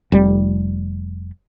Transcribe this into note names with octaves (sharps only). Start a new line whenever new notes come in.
F1 G3